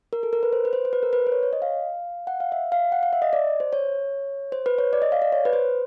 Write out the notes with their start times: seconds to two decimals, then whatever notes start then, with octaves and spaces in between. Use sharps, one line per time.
0.13 A#4
0.23 A4
0.33 A#4
0.43 B4
0.53 C5
0.65 B4
0.73 C5
0.85 C5
0.93 B4
1.03 A#4
1.13 B4
1.27 C5
1.32 C#5
1.43 C#5
1.53 D#5
1.62 F5
2.27 F#5
2.40 F5
2.52 E5
2.72 F5
2.92 F#5
3.03 F5
3.13 E5
3.22 D#5
3.33 D5
3.60 C5
3.73 C#5
4.52 C5
4.66 B4
4.78 C#5
4.93 D5
5.02 D#5
5.12 F5
5.22 D5
5.32 C#5
5.45 B4
5.53 C5